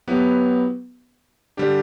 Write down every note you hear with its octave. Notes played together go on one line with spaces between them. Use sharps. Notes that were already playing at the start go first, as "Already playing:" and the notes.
F#3 B3 E4 G4 B4
D3 G3 D4 G4